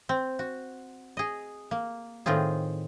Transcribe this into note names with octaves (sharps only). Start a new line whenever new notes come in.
C4
F#4
G#4 D#5
A#3
A2 D#3 C4 F4 G#4